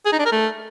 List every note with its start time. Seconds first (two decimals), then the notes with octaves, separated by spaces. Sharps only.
0.06 G#4
0.12 D#4
0.19 D4
0.25 A#4
0.32 A3